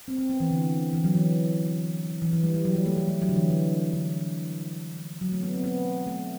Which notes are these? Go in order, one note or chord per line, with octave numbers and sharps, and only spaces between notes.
C4
C4
B3
E3
D3
E3
F#3
E3
E3
E3
G3
G3
F#3
G3
A3
A3
G3
F#3
D3
E3
D3
D3
F#3
A3
B3
C4
B3
A3